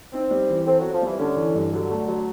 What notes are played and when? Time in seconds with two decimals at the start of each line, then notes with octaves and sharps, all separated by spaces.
0.13 C4 D#4
0.31 G3
0.49 E3
0.66 C4 A4
0.80 F#3 C4
0.93 F3
1.02 E3 G3
1.19 D3 C#4
1.37 E3
1.55 G2
1.73 D3 F#3
1.90 A3
2.08 F#3